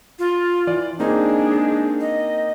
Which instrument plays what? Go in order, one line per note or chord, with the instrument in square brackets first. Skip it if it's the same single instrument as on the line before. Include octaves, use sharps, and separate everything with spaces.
[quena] F4
[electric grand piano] E3 D5
[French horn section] G#3 D4 [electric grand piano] A#3 C4 D#4 [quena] G#4
[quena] D#5